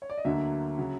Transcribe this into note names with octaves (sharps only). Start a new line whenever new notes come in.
C#5
D5
D#5
D2 D3 F#3 A#3 E5
C#3 F#3